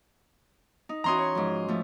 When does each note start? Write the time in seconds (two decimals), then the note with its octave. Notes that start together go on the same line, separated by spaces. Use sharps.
0.89 D#4
1.04 E3 C#4 F#4 A#5 C6 D#6
1.18 C#5
1.35 G#2 F3
1.68 F3 A3